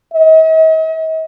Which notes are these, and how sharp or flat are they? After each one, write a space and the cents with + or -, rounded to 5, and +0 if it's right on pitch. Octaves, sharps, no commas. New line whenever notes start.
D#5 +45